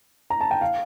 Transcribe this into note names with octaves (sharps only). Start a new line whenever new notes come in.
A#5
A5
G5
F5